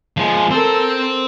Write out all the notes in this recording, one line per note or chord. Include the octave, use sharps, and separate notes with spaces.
F3 G#3
C4 A4 A#4